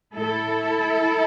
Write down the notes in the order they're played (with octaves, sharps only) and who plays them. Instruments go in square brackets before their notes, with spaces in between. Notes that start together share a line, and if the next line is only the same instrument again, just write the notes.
[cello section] A2 A3 E4 A4